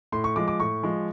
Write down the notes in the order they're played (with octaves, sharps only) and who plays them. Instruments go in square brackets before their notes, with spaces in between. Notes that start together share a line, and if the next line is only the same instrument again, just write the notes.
[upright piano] A2 C6
C#6
F3 G#3 D6
D6
A2 C#6
F3 G#3